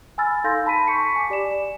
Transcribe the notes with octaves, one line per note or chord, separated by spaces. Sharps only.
G#5 B5 E6 F6 A6
D#4 A4 F5 C6 G6 A#6
A5 B5 B6 D#7
C#6 B6 C#7
G#5 D6
G4 D5 G#5 E7